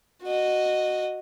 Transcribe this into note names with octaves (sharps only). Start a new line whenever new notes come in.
F#4 D#5